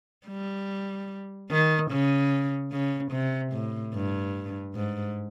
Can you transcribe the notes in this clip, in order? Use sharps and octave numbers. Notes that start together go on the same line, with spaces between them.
G3
D#3
C#3
C#3
C3
A2
G2
G#2